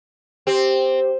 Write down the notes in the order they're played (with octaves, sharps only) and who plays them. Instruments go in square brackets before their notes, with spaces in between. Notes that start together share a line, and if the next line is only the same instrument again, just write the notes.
[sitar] C4 [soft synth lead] G4